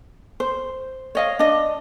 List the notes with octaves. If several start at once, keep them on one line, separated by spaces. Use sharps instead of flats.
C5
C#5 D#5 F5
D4 D#5